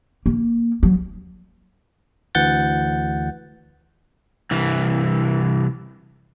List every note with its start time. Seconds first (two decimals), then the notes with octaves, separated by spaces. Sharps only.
0.26 A#3
0.83 F#3
2.35 D2 E3 F#5 G6 A6
4.51 C2 E3